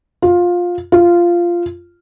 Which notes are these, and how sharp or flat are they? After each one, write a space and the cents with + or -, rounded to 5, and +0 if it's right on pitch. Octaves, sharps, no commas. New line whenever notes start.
F4 +15
F4 -10